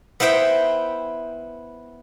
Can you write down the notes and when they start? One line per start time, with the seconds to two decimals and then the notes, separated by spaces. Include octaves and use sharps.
0.20 B3 E4 C5 E5 G5